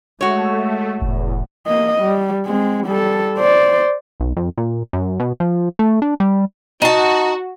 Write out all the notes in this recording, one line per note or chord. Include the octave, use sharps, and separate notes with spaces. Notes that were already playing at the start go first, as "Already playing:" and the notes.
G#3 A3 F#4 C#5
F1 E2 A2
A#3 D#5
G3
G#3 C4
G3 A4
C5 D5
B1
F2
A#2
F#2
B2
F3
A3
D4
G3
D#4 F#4 A5